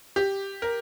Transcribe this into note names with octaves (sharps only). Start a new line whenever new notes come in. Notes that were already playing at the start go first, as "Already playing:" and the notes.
G4
A#4